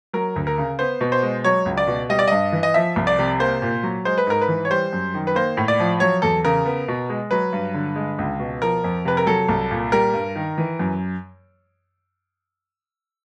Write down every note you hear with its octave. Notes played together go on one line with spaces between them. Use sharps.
F#3 A#4
D2
A#4
C#3
B3 C5
B2
C5
G#3
F#3 C#5
C#2
D5
B2
G3 D#5
D5
G2 D#5
E3
D#5
F3 E5
C2
D5
C3
A#3 C5
A#2
F#3
G#3 C5
B4
G#2 A#4
B4
E3
C#5
G3 C5
F#2
D#3
B4
A#3 C5
A2
D5
F3
F#3 C#5
E2 A4
C#3 A#4
B3
B2
G#3
F#3 B4
G2
D3
G#3
C#2
B2
F3 A#4
F2
C3 B4
A#4
F#3 A4
C2
A#2
G3 A#4
G2
D#3
E3
F#2